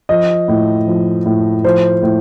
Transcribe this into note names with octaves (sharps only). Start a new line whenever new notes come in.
F3 D#5
A2
F3
A2
F3 C5
A2